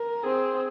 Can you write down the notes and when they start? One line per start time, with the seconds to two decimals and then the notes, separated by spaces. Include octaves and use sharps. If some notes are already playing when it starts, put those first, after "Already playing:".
Already playing: A#4
0.24 C4 G#4